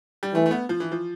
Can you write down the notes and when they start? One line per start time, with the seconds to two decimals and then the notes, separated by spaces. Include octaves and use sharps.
0.23 G3
0.34 E3 A3
0.46 A3
0.51 B3
0.69 F3
0.80 E3
0.92 F3